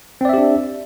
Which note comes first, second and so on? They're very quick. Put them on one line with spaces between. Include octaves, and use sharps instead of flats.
C4 D5 E5 G4 D4